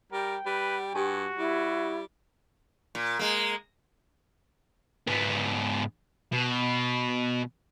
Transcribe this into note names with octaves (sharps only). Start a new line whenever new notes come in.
G3 A#4 G5
G3 B4
G2 F#4 G4 G#5 A5
G3 E4
A#2
G#3 A#3
G#2 B3
B2